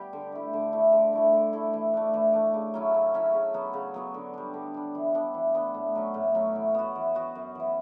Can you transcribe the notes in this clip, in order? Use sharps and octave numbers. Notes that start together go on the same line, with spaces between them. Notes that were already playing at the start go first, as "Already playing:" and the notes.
Already playing: G3 B3 G4
D3
A3 E4
D3
A3 E4
D3
A3 E4 A4
D3
A3 E4 A4
E3
A3 D4
E3
A3 D4
C#3
F#3 C#4 E4
C#3
F#3 C#4 E4
C#3
F#3 B3 F#4
C#3
F#3 B3 F#4
D3
G3 D4
D3
G3 D4
E3
B3 D4 A4
E3
B3 D4 A4
A2
F#3 C#4
A2
F#3 C#4
E3
B3 F#4
E3
B3 F#4
F#2
E3 B3